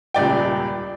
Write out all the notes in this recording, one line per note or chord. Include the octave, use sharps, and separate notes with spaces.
D#1 C#2 D5 G5